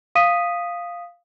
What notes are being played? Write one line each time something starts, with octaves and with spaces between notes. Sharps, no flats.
F5 D#6 B6 D#7